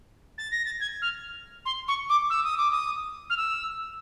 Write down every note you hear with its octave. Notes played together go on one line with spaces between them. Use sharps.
A6
A#6
A6
G#6
F6
C6
C#6
D6
E6
D#6
D6
D#6
F6
E6